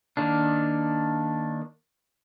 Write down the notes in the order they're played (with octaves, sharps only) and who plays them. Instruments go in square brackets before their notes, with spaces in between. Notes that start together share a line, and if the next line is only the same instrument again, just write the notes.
[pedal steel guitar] D#3 A#3 D4